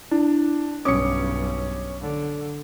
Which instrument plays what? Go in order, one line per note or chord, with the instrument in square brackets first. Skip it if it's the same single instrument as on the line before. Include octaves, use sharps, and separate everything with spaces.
[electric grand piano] D4 [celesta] E4
[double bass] B1 G2 [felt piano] C#4 [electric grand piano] D6 C#7 [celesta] D#6
[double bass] D3